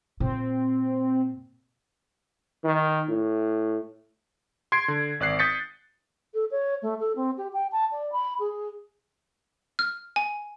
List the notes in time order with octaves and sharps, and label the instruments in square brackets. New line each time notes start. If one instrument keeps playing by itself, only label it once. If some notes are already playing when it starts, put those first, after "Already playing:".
[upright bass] A#2 [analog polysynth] C4
[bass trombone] D#3
A2
[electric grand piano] C6 G#6 C7 D7
D3
G#1 D5 F#6 C7
D#6 G6 A6 B6 C#7
[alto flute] A4
C#5
A3
A4
C4
G4
G5
A5
D5
B5
G#4
[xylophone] F6
G#5